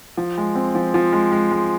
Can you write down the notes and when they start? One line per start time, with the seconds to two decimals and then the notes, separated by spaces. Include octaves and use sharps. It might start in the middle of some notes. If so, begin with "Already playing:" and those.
0.17 F3
0.38 G#3
0.56 C4
0.75 F3
0.94 F3
1.13 G#3
1.32 G#3
1.51 G#3